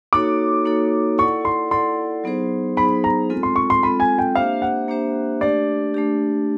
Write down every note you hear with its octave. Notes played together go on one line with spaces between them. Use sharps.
A#3 D#4 F#4 A4 C#5 D6
A#3 D#4 F#4 A4 C#5
E4 A4 D5 F#5 C#6
C6
E4 A4 D5 F#5 C6
F#3 B3 D#4 G#4 C5
F#3 B3 D#4 G#4 C5 B5
A#5
G#3 C4 F4 A4
C6
C#6
C6
G#3 C4 F4 A4 B5
G#5
G5
A#3 D4 G4 C5 E5 F5
F#5
A#3 D4 G4 C5 E5
A3 D4 G4 D5
A3 D4 G4